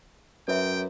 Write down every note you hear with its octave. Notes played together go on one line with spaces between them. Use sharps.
F#2 B4 C#5 E5 G5